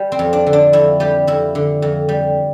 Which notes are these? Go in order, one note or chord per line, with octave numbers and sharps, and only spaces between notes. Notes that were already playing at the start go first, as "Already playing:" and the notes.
Already playing: G3
C4
F2
D4
D3
D4
F2 E4
G3 G4
F2 E4
D3
F2
G3